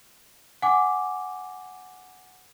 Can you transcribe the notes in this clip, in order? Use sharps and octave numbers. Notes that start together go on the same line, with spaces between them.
F#5 G#5 D6